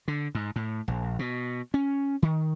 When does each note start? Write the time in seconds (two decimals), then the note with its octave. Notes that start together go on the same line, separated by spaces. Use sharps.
0.08 D3
0.35 G#2
0.56 A2
0.88 A#1
1.19 B2
1.74 C#4
2.22 D#3